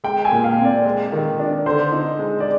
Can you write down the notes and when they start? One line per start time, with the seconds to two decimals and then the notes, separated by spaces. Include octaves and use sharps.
0.04 G#3 G5
0.25 G#5
0.32 A#2
0.44 F5
0.59 C4
0.65 D5
0.85 G#3
1.12 D#3
1.39 D4
1.66 D3 C5
1.92 D#4
2.19 G#3
2.40 D5